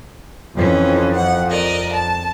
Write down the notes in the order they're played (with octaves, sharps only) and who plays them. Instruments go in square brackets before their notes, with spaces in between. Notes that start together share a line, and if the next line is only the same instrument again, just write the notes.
[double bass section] F2 [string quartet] E3 C#4
[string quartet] F#5
A#4 D5 D#5
A5